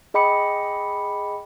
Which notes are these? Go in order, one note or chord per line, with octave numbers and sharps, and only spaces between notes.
G#4 D#5 G5 B5 D6 C#7